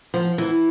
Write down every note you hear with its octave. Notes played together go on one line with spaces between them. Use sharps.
F3
E3